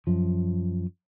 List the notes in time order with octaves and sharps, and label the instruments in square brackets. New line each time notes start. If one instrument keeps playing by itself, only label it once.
[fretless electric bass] F#2 F3